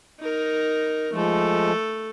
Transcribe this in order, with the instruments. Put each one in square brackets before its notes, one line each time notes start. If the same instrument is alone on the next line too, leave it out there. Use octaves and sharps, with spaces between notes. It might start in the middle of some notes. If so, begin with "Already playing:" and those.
[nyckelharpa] D#4 A#4
[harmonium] F3 G#3 [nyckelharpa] A3 A4